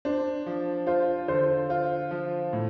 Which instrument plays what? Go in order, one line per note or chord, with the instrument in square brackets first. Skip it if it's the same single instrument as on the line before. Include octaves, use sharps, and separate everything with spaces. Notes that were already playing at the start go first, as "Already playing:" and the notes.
[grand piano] D4 [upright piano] C5
[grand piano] F3
[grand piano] F4 [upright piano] C5
[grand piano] D3 [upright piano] C5
[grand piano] F4 [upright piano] C5
[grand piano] F3
A2